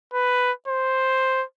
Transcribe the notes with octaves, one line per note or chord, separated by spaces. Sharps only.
B4
C5